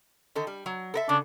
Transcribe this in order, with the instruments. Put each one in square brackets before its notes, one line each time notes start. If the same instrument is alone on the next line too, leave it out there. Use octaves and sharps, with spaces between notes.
[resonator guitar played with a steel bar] D3 D#3 A4
G3
F#3
A4 A#4 E5
[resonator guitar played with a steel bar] C#3 [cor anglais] D4